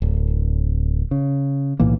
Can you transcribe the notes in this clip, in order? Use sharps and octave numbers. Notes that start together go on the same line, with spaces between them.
D1
C#3
B1 A2 E3 A#3